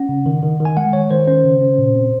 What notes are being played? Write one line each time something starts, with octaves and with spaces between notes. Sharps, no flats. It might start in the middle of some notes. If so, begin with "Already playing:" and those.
Already playing: C#4 F#5
C#3
D#3
D#3
D#3
G#5
G#3 F#5
D#3 C#5
D#3 C5
C#4 C5
C#3
C#4
A#2
C4